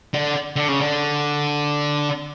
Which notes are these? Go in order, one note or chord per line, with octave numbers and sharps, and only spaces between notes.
D3
D3
C#3
D3